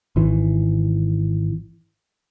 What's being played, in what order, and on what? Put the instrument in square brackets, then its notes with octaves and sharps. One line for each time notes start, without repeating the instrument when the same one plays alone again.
[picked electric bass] G#1 E3